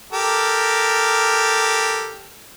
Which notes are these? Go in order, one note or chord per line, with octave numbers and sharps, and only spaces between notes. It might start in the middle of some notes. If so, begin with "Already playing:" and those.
G4 A4 A#4